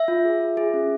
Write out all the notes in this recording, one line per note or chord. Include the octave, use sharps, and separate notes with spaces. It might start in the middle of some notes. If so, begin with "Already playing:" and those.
Already playing: E5
F4
G#4
F4
G#4
C#4